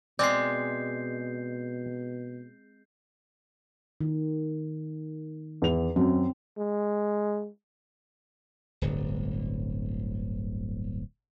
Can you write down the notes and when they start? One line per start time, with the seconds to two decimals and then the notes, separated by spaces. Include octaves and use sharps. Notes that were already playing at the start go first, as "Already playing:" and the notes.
0.19 B2 G#3 C4 D5 G6 C7
4.01 D#3
5.62 E2 F7
5.96 F#2 C4
6.57 G#3
8.82 D1 G1